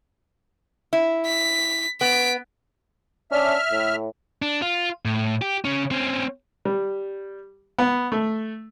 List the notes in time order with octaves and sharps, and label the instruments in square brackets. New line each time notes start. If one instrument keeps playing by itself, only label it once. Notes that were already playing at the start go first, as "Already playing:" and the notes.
[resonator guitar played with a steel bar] E4
[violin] B6
[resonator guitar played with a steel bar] B3 [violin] B6 D7
[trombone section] C#4 D4 [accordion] E5 F6
[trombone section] A2
[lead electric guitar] D4
F4
A2
G4
C#3 C#4
C4 C#4
[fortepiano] G3
B3
A3